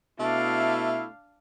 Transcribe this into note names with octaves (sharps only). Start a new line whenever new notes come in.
B2 A3 D4 E4 F5